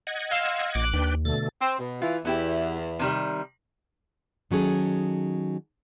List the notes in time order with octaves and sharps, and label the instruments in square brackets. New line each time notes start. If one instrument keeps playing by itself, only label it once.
[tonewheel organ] D#5 F#5 G#6
[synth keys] F5 C6 E6
[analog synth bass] A#1 [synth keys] D6 F#6
[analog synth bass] D#2 [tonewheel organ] D4 B4 G5
[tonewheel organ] B2 D3 A3 [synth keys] A6
[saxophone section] C4
B2
[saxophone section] E3 [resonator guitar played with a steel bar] F4
[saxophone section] E2 [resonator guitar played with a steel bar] B3 E4 G4
[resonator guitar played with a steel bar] C3 D#3 G3
[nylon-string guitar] D#3 F#3 C#4 G#4 A4